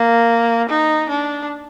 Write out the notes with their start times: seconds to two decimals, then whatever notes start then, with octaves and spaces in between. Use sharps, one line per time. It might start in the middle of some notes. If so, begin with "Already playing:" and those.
Already playing: A#3
0.69 D#4
1.09 D4